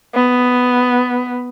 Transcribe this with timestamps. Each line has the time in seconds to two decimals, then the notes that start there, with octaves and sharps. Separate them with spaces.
0.14 B3